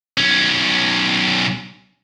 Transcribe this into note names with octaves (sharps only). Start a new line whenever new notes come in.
B1 C#4